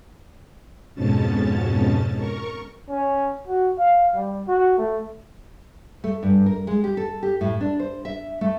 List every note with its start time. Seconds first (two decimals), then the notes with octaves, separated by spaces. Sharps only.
0.95 F2 G#2 B2 C#4 A5 A6
2.16 A#4 C#6
2.89 C#4
3.47 F#4
3.79 F5
4.15 G3
4.48 F#4
4.78 A3
6.04 A3
6.23 G2
6.46 A#4
6.67 G#3
6.84 G4
6.97 A4
7.23 G4
7.41 A2
7.61 D4
7.79 C5
8.05 E5
8.41 A3